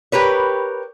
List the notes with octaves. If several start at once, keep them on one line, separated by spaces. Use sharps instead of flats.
G4 A#4 B4 C#5